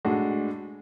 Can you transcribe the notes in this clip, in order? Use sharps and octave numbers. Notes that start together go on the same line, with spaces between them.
A2 G#3 D4 F#4